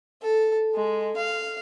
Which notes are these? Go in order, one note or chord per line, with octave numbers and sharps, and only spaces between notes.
A4
G#3
F5